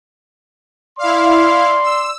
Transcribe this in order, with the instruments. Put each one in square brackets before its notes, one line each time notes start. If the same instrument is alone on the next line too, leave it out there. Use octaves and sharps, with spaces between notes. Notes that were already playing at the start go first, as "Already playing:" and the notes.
[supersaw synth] E4 F5 [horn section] D5 C6
[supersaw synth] E6